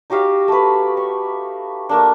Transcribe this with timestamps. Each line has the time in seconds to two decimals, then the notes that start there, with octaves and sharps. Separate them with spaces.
0.10 D#4 F#4 G4 F5
0.48 A3 B4
0.97 C#6
1.89 A3 A#3 D4